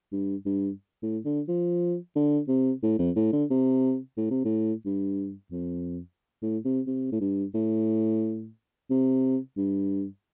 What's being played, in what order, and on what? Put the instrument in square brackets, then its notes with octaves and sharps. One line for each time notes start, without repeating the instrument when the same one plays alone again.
[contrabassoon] G2
G2
A2
D3
F3
D3
C3
A2
F2
A2
D3
C3
A2
C3
A2
G2
F2
A2
C3
C3
A2
G2
A2
C3
G2